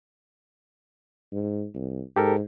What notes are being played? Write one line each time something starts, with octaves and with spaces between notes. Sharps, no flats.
G#2
C2
G#2 G4 A4 A#4